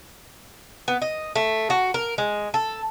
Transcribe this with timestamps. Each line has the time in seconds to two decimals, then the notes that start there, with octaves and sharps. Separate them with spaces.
0.88 B3
1.02 D#5
1.35 A3
1.70 F#4
1.94 A#4
2.18 G#3
2.54 A4